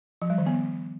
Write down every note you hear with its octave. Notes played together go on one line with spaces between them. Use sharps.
F3
G3
D#3
B3